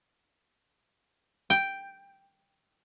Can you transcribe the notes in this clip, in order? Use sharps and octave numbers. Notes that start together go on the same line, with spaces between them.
G5